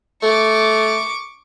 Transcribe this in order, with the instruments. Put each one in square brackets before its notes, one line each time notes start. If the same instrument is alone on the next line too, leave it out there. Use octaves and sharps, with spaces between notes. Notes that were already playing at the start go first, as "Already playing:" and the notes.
[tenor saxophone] A3 [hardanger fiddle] C#6 D6